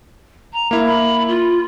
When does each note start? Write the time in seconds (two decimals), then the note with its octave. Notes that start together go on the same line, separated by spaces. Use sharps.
0.52 A#5
0.71 A#3 E4
0.85 B5
1.28 F4